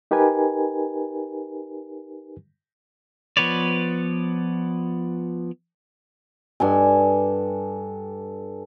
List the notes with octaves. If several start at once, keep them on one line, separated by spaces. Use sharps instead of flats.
D#4 G4 A#4 B4 G#5
F3 B3 B4 C#5 D5
G2 A4 G#5